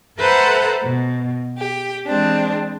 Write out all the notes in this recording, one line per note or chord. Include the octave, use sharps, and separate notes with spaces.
A4 B4 C5 E5 F#5 A#5
B2
G4
E3 G#3 C4 D4